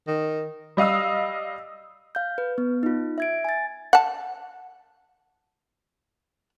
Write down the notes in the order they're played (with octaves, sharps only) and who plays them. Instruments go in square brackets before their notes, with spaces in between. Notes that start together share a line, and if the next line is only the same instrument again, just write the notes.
[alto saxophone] D#3
[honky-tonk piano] G3 D#5 F5 D#6 E6
[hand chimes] F5 G6
B4
B3
D#4 F4
E5 G#6 D7
G#5 A6
[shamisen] F#5 A5